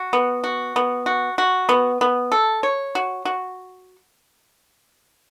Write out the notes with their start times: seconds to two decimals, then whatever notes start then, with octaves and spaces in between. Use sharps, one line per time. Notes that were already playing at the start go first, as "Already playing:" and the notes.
Already playing: F#4
0.13 B3
0.44 F#4
0.76 B3
1.06 F#4
1.38 F#4
1.69 B3
2.01 B3
2.32 A4
2.63 C#5
2.95 F#4
3.25 F#4